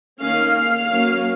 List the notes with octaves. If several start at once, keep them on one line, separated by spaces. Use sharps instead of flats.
D#3 A#3 C#4 F5
F#3 A#3 C#4